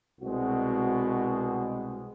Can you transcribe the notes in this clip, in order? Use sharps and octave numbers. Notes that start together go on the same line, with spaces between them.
C2 B2 G#3 C4 F#4